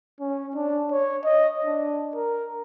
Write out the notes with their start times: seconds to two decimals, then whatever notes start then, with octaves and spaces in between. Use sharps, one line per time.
0.21 C#4
0.55 D4
0.92 C#5
1.24 D#5
1.65 D4
2.16 A#4